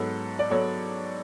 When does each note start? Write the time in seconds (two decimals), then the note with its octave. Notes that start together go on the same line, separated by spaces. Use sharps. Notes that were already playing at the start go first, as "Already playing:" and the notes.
Already playing: G#2 F#3 B3 A4 C#5
0.39 D5
0.50 F#3 B3 A4 C#5